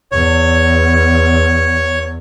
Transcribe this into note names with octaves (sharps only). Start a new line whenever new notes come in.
E2 C#5